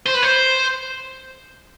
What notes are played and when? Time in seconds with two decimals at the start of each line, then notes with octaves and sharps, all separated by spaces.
0.06 C5
0.14 B4
0.22 C5